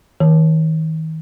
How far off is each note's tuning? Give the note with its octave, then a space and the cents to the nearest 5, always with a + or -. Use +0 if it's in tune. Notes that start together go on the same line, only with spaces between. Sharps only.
D#3 +40